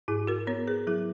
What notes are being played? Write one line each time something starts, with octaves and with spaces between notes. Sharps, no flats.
G#2 E4 G#4
F#4 A#4
B3 A#4 C#5
G#4 B4
F#3 E4 G#4